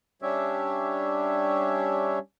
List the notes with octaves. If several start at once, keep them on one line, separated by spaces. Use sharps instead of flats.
G3 C#4 D4 G4 C#5 E5